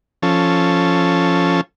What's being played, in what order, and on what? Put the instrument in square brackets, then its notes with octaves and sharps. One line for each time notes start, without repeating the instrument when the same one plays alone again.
[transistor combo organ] F3 C#4 A4